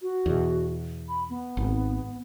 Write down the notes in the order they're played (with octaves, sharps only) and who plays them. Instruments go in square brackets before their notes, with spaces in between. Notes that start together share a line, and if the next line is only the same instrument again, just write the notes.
[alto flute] F#4
[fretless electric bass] E2 B2
[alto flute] B5
B3
[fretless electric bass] G#1